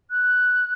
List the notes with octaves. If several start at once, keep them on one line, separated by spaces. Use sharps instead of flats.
F#6